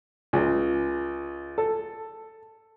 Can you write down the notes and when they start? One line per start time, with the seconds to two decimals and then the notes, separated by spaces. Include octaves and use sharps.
0.33 C#2
1.58 A4